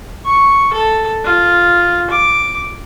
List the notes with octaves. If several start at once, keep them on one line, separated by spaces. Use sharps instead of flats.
C#6
A4
F4
D6